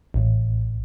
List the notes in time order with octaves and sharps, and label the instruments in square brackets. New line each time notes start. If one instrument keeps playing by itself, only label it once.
[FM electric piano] A1